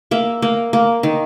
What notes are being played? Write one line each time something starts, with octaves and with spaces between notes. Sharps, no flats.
A#3 E5
A#3
A#3
D#3